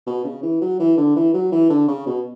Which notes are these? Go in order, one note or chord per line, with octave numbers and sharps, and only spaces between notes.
B2
C#3
E3
F#3
E3
D3
E3
F#3
E3
D3
C#3
B2